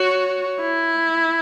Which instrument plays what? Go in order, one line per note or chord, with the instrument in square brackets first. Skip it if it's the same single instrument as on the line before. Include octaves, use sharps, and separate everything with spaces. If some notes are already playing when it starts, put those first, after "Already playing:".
Already playing: [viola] F#4 [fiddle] C#5
[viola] E4